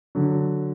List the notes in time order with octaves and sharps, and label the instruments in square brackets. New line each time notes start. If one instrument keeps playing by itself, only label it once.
[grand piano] D3 F#3